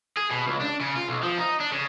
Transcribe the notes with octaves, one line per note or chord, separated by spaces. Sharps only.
G#4
B2
C#2
D4
C#3
F4
B1
F3
D#4
D4
C#3